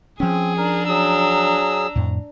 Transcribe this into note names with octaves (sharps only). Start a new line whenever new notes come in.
F3 C4 C#4 G#4
D4 A#4 A#5
F#3 G#4 E6
F2 A2